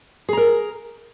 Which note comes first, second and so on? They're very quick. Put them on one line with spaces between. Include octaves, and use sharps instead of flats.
G#4 A#5 A#4